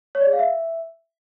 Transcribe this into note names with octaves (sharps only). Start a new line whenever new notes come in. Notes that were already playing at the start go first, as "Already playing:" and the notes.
C#5
D5
G#4
F5
E5